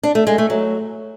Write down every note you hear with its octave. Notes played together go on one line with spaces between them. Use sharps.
D4
A3
G#3
A3
F#3